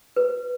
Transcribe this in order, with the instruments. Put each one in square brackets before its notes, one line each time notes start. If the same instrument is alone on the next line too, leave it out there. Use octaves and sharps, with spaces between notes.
[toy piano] B4